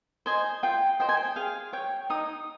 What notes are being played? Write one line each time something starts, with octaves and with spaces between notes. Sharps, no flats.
C5 D#5 G#5
F4 G5
C5 D#5 G5
G#5
G5
G#4 F5
C#5 G5
D#4 D#6